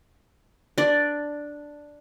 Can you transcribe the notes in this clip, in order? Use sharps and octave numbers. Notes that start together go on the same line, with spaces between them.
D4 D5